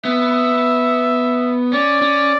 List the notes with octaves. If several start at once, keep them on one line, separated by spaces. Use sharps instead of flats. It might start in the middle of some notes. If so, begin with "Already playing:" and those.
B3 E5
C#4 D5
C#4